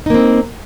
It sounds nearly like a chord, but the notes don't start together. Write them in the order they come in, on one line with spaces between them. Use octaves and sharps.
D#4 A#3 C4